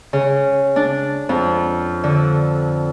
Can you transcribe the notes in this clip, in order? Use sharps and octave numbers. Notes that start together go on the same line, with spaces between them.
C#3
D4
F2
D3